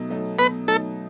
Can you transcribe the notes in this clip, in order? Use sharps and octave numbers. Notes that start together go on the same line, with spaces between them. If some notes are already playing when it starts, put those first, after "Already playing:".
Already playing: B2 F#3 A3 D#4
F#3 A3 D#4
B2 B4
F#3 A3 D#4 A4